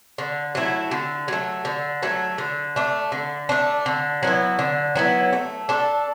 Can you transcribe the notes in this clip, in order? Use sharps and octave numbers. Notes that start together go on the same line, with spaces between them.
D3
F#3 A3 E4
D3
F#3 A3
D3
F#3 A3
D3
A3 D4
D3
A3 D4
D3
F#3 B3 E4
D3
F#3 B3 E4
A3
D4 A4